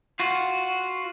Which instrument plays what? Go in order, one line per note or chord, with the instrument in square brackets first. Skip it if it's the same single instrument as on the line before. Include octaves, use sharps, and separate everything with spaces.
[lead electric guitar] F4 F#4